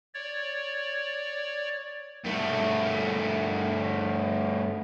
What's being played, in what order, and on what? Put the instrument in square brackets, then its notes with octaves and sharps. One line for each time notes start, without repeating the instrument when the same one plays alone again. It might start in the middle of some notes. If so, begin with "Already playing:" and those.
[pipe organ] C#5 D5
[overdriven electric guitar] G2 A3